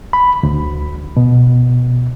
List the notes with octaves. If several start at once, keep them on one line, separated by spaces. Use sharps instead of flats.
B5
D2
B2